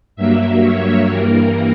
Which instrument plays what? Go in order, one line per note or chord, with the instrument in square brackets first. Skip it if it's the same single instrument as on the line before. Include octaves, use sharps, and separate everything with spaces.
[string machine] G2 F#3 A#3 E5
C#5
G2 E3 G3 A#3 A#4